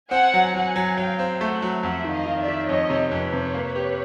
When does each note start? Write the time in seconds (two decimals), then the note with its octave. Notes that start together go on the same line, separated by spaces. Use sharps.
0.11 C4 F#5 G#5
0.34 F#3
0.54 F#3 F#5 G#5
0.76 F#3
0.97 F#3 F5 G5
1.19 C4
1.40 A3 E5 F#5
1.62 F#3
1.83 F2 E5 F#5
2.04 D#3
2.11 D#5 F5
2.26 D#3
2.40 D5 E5
2.48 D#3
2.68 F2 C#5 D#5
2.90 C3
3.11 F2 B4 C#5
3.33 C3
3.54 A#3
3.75 G4